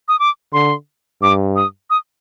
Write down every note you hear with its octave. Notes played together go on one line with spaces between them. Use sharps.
D#6
D6
D3 C6
G2 D6
D#6
D#6